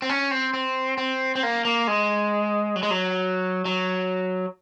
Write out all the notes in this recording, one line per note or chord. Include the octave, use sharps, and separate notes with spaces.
C4
C#4
C4
C4
C4
C4
A#3
A#3
G#3
F#3
G#3
F#3
F#3